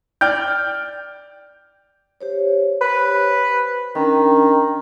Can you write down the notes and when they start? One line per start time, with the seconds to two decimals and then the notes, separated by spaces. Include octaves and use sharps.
0.21 D5 G5 F6 G6
2.21 G4 C5 C#5
2.81 B4
3.95 D#3 C#4 D4 G5